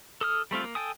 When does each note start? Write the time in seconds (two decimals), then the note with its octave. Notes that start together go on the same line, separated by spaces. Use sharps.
0.21 A4 D#6 F6
0.51 G3 A3 C4 F4
0.64 A#3
0.75 A4 G5 G#5 D#6